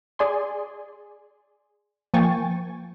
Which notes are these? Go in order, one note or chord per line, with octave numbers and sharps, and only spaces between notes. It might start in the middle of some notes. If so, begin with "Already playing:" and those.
G#4 D5 G#5 C6
F3 A#3 G5 G#5 C#6 A6